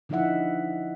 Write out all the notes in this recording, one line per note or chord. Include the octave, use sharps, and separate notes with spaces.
D3 F3 D#4 E4 E5 F#5